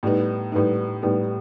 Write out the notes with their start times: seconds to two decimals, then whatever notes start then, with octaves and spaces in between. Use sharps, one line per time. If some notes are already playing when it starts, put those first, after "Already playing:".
0.03 A2 G3 B3 D#4
0.52 A2 G3 B3 D#4
1.02 A2 G3 B3 D#4